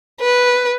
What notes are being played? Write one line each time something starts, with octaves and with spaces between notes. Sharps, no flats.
B4